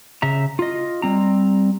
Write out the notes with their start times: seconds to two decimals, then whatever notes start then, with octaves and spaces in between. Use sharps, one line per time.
0.22 C#3 E5 A#5
0.59 F4 D#5
1.02 G3 C4 A#5